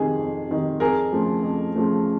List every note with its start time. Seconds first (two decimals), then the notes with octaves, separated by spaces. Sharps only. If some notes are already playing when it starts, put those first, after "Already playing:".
Already playing: F2 C3 D#3 G#4
0.17 F2
0.49 C3 D#3
0.80 F2 G#4 A#4
1.12 C#3 F3 A3
1.43 F2
1.75 C#3 F3 A3